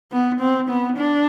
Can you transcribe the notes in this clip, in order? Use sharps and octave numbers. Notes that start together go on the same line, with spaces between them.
B3
C4
B3
D4